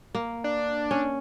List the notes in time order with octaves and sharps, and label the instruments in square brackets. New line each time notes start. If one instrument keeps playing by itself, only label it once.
[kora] A#3
[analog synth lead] D4
[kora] C#4